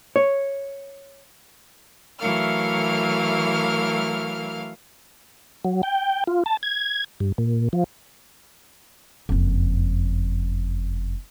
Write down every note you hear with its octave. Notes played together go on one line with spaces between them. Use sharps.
C#5
E3 F#3 A3 A#4 F5 F6
F#3
G5
F4
A5
G#6
G2
A#2
F3
F#1 F2